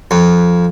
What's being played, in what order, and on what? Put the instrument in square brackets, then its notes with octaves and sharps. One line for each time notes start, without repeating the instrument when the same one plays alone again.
[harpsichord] F2